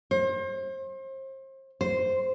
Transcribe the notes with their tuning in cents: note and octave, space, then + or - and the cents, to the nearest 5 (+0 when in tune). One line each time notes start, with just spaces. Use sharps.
C5 +35
C5 -5